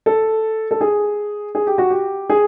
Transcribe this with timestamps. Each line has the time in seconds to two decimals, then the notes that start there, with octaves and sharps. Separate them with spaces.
0.06 A4
0.71 A4
0.81 G#4
1.55 G#4
1.67 G4
1.78 F#4
1.90 G4
2.30 G#4